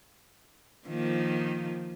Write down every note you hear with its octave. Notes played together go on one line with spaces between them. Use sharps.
D#3 F3 A#3